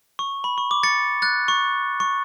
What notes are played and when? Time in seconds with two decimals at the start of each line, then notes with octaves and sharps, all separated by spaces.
0.19 C#6
0.44 B5
0.58 C#6
0.71 D6
0.83 A6 C#7
1.22 F#6 A6
1.48 C#6
2.00 C#6